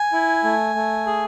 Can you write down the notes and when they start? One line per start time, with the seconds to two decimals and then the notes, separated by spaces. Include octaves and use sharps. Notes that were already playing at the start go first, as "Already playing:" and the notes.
Already playing: G#5
0.13 E4
0.44 A3
0.75 A3
1.07 G#4